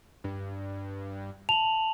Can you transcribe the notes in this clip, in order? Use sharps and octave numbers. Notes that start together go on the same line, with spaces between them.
G2
A5 F7 F#7